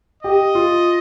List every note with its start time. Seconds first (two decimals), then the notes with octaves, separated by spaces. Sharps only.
0.23 G4 D#5
0.55 F4